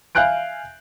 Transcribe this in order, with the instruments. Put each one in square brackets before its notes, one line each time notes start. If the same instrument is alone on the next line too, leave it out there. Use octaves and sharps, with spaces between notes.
[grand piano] E5 F5 G#5 F#6 G6 D7